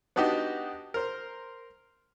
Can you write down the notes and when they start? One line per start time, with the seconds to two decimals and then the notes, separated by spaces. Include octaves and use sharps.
0.16 B3 D4 D#4 F#4 G4
0.94 A#4 C5